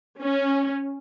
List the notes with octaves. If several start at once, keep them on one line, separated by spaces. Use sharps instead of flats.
C#4